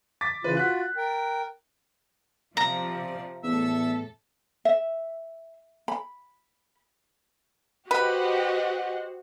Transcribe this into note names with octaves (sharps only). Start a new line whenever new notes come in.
D6 A6 B6
C#3 E3 F4 B4
F4 F#4 F#6 B6
A#4 G5
C3 F3 D5 A#5
E2 A2 A4 E5 E6
E5
B5
F#4 G4 B4 C5 D#5 F#5